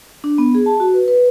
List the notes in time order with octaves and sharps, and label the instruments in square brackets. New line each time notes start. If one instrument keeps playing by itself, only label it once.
[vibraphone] D4
B3
G#4
A5
F#4
B4
B4